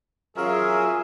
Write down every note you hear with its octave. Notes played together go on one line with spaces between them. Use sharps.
F#3 C#4 F4 G#4 A#4 E5 G#5